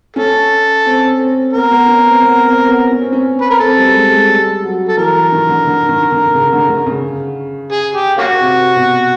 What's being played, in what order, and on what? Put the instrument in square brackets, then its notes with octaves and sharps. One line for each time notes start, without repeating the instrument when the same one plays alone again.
[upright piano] C#4 [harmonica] A4
[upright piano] C4
C4
[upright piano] B3 [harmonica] A#4
[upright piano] B3
C#4
C4
B3
C4
B3
C#4
C4
C#4
[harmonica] B4
A#4
[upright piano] C4 [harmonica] A4
[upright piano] G3
G#3
G#3
G3
F#3
[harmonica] A4
[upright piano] E3 [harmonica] A#4
[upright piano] D#3
D3
D3
D#3
D3
C#3
D3
D3
C#3
[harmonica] G#4
G4
A#3 C#4 F#4
[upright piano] C3
B2